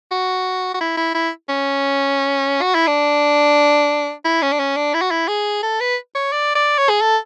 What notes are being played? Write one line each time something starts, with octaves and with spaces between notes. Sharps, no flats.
F#4
F#4
E4
E4
E4
C#4
F#4
E4
D4
E4
C#4
D4
C#4
D4
E4
F#4
E4
G#4
A4
B4
C#5
D5
D5
C#5
G#4
A4